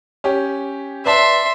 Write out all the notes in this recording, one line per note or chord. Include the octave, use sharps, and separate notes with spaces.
C#4 G4
B4 D5 E5 A5 C6